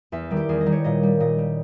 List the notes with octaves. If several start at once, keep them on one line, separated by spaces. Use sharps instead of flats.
E2 E5
D#3 G3
G4
E2 G#4
D#5
D#3 G3
C#5
A#2 D#5
G3
A#2 D#5
G3